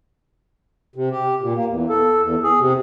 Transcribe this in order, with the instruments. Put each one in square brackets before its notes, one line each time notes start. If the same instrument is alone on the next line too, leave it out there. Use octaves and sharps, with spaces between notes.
[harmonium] C3
G4
A#2
A#3
E2
A4
E2
G#4
C3